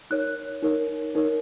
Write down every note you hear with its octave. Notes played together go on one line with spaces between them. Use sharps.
D#4 A#4 C#5 F#6
D#4 A#4 C#5
D#4 A#4 C#5